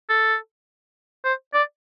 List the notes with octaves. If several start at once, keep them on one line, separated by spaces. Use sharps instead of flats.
A4
C5
D5